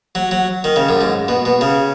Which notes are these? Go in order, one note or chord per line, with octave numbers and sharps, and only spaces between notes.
F#3
F#3
D#3
C#3
F#2
G#2
B2
B2
C#3